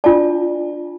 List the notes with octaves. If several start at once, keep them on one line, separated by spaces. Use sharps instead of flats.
D4 F4 D5 A5